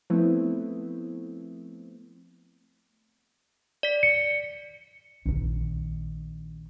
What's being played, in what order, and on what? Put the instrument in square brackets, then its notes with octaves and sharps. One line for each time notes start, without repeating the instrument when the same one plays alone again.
[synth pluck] F3 A3 B3 C4 E4
[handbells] D5 B6
[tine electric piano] C#7
[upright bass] A#1 D#3